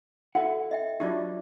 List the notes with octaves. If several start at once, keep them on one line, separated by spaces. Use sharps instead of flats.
E4 F#4 A4 F#5
D#5 E5 G5
F#3 D4 E4 F4 G4